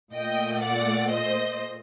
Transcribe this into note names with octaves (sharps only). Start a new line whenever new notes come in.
A#2 A3 D#5 G5
D5 F#5
C5 D#5